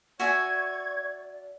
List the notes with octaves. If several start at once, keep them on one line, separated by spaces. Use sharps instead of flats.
F#4 D5 E5 G#5 C#6 G#6